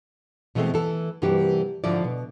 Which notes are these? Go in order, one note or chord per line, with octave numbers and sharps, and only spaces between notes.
B2 E3 G#3 A3 C4
E3 A4
G2 C3 E3 A#3 F#4 G4
G#2 D3 F3 E4 F#4 D5
B2